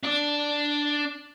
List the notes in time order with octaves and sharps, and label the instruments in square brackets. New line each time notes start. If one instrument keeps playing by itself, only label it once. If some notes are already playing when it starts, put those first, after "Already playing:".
[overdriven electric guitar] D4 D5